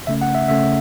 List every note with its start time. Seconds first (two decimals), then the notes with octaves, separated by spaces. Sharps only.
0.07 C#3 A3 C#4 E5
0.22 F#5
0.35 E5
0.48 C#3 A3 C#4 E5